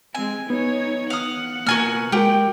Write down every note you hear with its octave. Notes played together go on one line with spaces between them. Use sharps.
G#3 C4 G#5
B3 D#4 C#5
F5 F#5 D#6
B2 A#3 F#4 G#5 F6
G#3 F#4 G4 A#4 G5